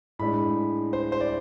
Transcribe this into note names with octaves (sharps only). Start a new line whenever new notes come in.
A2 G#3 D4 B5
C5
C5
D5